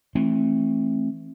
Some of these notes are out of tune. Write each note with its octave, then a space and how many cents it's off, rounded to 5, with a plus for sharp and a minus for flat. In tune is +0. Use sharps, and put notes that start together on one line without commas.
E3 +0 A3 +0 C4 +30